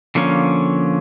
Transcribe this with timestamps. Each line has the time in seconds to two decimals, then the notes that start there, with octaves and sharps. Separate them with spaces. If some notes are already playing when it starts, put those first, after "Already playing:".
0.15 D3 F3 A#3 C#4